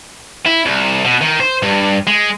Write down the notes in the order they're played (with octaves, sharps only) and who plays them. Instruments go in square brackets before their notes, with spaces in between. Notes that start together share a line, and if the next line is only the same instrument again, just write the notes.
[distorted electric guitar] E4
C2
B2
D#3
C5
G2
G#3